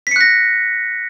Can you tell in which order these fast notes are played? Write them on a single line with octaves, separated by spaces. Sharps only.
B6 C#7 F#6 A#6